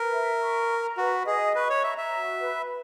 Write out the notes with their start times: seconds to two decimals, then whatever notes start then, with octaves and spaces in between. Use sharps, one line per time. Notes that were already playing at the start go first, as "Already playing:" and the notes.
Already playing: A#4 B4
0.12 E5
0.41 C#6
0.70 A#5
0.97 F#4 B4
1.26 G#4 D#5
1.55 B4 C#6
1.70 C#5
1.83 E5 A#5
1.98 E5
2.11 F#4
2.41 B4